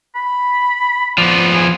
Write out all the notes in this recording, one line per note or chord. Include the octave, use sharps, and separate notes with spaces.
B5
F3 B3 D5
G#4